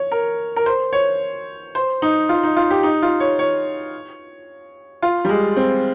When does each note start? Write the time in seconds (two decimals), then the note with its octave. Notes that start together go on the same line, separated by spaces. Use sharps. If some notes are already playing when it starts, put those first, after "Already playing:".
Already playing: C#5
0.12 A#4
0.56 A#4
0.66 C5
0.93 C#5
1.75 C5
2.02 D#4
2.29 F4
2.43 D#4
2.56 F4
2.70 G4
2.83 D#4
3.02 F4
3.20 C#5
3.39 C#5
5.02 F4
5.25 G3
5.29 G#3
5.57 C4